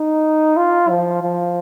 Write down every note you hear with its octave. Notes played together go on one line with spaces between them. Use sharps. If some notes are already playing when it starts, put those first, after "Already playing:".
Already playing: D#4
F4
F3
F3